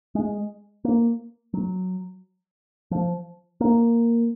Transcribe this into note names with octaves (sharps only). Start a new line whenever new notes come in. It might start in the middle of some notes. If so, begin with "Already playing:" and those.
G#3
A#3
F#3
F3
A#3